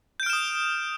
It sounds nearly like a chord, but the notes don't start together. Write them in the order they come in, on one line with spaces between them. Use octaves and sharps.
G6 D7 F6 E7 D#6